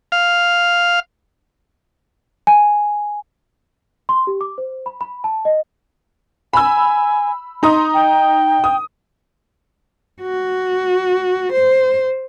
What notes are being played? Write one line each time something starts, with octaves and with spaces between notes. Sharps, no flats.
F5
G#5
C6
G4
D6
C5
B5
B5
A5
D#5
G#5 B5 E6
D#4 A#5 C6 D#6
G5
D#6
F#4
C5